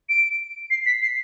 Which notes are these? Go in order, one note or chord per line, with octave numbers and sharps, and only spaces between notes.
D7
C7
B6
C7